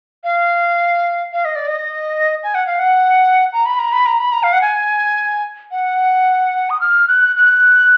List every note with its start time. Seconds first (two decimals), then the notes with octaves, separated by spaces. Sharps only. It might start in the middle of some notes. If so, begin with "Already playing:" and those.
0.24 F5
1.33 F5
1.45 D#5
1.56 D5
1.67 D#5
2.44 G#5
2.55 F#5
2.67 F5
2.79 F#5
3.53 A#5
3.66 B5
3.79 A#5
3.92 B5
4.06 A#5
4.19 B5
4.32 A#5
4.43 F5
4.53 F#5
4.61 G#5
5.71 F#5
6.70 D#6
6.81 F6
7.08 F#6
7.36 F#6